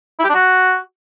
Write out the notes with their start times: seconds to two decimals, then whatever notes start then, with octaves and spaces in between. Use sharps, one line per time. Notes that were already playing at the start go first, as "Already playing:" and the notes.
0.19 E4
0.24 G4
0.29 D4
0.34 F#4